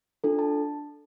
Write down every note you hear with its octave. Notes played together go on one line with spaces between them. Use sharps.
D4 F4 A4
A5